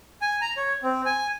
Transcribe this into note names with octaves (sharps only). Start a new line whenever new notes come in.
G#5
A#5
C#5
C4
G#5